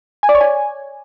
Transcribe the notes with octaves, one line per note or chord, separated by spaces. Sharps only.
G#5
D5
C#5
G#5